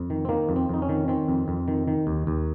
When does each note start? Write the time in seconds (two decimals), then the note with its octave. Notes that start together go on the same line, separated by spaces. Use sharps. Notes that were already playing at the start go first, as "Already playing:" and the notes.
Already playing: F2
0.10 D#3
0.25 C4
0.29 D#3 A#3
0.49 F2
0.56 C4
0.69 F2 D#4
0.82 C#4
0.89 D#3
1.08 D#3 C4
1.28 F2
1.48 F2
1.68 D#3
1.88 D#3
2.07 D#2
2.27 D#2